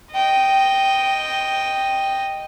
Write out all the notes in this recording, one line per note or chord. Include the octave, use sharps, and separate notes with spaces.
D#5 G5